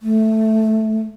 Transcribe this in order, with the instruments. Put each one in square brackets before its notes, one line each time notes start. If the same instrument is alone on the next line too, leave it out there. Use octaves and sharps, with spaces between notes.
[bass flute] A3